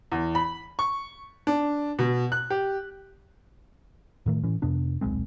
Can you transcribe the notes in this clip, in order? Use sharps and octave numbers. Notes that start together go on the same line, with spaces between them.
E2
B5
C#6
D4
B2
F#6
G4
A2 D#3 A3
A2 E3 C#4
F2 C3 B3 D4
D#1 B1 G#3 C4